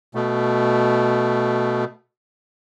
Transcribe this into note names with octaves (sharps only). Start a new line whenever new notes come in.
B2 A3